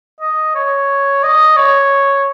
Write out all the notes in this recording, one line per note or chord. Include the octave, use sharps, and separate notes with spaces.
D#5
C#5
D#5
C#5